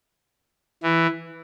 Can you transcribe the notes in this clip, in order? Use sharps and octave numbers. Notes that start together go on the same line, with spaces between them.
E3